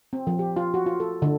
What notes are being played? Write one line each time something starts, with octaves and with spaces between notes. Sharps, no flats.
C4
F3
G4
F4
F#4
F4
A4
D3